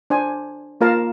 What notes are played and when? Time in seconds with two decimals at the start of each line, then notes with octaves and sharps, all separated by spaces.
0.10 D4 C5 G#5
0.81 A#3 F4 A#4 F5 A5 A#5